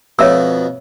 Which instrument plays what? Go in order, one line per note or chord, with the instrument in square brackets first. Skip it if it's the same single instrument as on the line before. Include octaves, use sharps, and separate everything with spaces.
[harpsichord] F2 B2 [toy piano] C#5 E5 E6